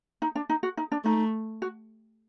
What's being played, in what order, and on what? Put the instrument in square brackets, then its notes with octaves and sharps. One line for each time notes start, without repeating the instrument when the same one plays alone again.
[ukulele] D#4
D4
D#4
F#4
D#4
D4
[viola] A3 [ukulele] D#4
[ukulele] F#4